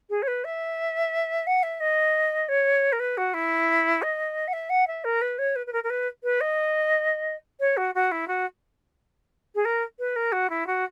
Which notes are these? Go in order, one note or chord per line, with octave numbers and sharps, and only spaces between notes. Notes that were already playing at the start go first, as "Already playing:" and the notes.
G#4
C#5
B4
E5
F#5
E5
D#5
C#5
A#4
B4
F#4
E4
D#5
F#5
E5
F#5
E5
A#4
B4
C#5
B4
B4
A#4
A#4
B4
B4
D#5
C#5
F#4
F#4
E4
F#4
G#4
A#4
B4
A#4
F#4
E4
F#4